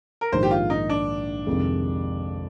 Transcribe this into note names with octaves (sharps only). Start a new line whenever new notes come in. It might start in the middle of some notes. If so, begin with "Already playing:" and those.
A#4
A#1 G#2 D#3 C5
G4
F4
D#4
D4
F2 C3 D#3 G#3